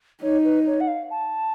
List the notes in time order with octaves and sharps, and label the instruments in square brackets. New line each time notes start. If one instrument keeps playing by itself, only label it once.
[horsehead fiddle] D#4 [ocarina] C#5
[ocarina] B4
C#5
F#5
F5
A5